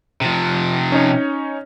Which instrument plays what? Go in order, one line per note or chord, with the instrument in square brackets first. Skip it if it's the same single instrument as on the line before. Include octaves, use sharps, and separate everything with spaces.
[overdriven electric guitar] C3 F3
[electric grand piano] C#4 D#4 C#5